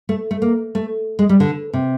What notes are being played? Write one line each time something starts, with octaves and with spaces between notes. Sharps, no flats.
A3
A3
A#3
A3
G#3
G3
D3
C3